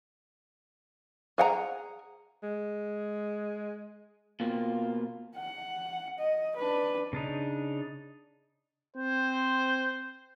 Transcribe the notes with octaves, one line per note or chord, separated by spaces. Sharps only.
G#4 F#5 G5 A#5
G#3
B2 A#3 C4 F4
F#5
D#5
D4 B4
C#3 D4 D#4
C4 C5